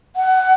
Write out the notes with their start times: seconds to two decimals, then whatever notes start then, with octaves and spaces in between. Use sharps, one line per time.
0.16 F#5